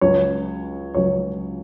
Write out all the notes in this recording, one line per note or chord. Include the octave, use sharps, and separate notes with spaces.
C#2 C#3 F#3 C#5
C#2 C#3 F#3 C#5